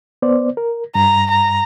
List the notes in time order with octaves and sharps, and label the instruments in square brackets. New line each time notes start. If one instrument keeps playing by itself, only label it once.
[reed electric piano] B3 C5 D5
A#4
[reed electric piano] G2 [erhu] A#5
[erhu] A#5